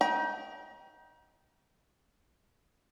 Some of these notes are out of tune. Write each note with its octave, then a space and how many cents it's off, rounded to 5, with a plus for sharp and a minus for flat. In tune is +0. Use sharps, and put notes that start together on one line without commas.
D#5 +10 G5 -10 A#5 +35